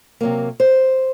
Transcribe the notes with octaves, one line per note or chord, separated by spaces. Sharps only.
C3 F#3 A#3
C5